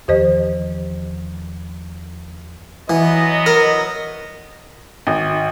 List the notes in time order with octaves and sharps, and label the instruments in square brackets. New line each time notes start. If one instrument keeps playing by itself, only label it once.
[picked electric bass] E2 D#3 F3 [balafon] G4 C5 D#5
[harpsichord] E3 [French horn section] F#3 B3 D#5
[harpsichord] A#4
[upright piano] G#1